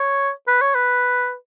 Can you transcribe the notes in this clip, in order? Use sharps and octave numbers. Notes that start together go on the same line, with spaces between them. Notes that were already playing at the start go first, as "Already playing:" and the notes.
Already playing: C#5
B4
C#5
B4